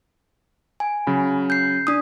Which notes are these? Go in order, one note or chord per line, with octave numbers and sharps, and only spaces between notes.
G#5
C#3 F#3 B5
G6 C7
D4 D#6